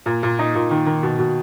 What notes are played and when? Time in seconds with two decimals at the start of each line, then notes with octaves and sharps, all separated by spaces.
0.06 A#2
0.23 A#2
0.39 D#4
0.55 A#2
0.71 D#3
0.86 D#3
1.03 B2
1.19 B2